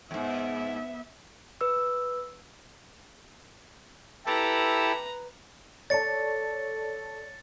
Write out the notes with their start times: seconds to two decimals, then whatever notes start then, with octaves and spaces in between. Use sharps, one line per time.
0.11 F2 G#2 B3 E5
1.61 B4 E6
4.26 E4 G4 A4 B4 A#5
5.90 A4 C#5 D5 A5 A6 C#7